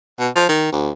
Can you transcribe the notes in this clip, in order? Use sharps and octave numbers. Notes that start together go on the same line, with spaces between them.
B2
F3
D#3
D2